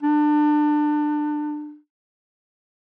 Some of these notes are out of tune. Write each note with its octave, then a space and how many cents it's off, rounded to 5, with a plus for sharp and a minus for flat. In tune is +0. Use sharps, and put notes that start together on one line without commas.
D4 +25